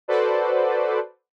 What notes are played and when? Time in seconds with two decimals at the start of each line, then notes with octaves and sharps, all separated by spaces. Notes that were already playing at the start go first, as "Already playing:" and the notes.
0.08 F#4 A4 B4 C5 D5